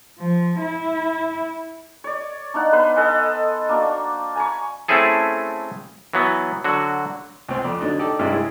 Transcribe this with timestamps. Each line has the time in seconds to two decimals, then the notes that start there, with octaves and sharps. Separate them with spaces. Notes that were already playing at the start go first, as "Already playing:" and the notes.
0.19 F3
0.61 E4
2.04 C#5 D5
2.54 D4 D#4 F5 F#5
2.73 B3 B4 C5
2.96 A4 D#5 F#5 G#5
3.69 A#3 D4 F#4
4.36 G#5 A#5 B5 C#6
4.88 A3 C4 C#4 E4 G#4 A4
6.13 E3 F#3 B3
6.64 D3 F#3 F#4
7.48 C#2 C4 C6
7.64 F2 D5
7.81 D3 F#3 D4 D#4
7.99 D#4 G4 A4 D5
8.19 G#1 G2 C3 E4 G#4 D#5
8.32 G#3 C#4 E4 G#4